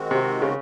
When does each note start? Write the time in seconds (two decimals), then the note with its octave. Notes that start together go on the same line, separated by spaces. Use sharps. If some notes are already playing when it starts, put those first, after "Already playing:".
Already playing: D#3 G#3 C4 F#4
0.11 C3
0.42 C#3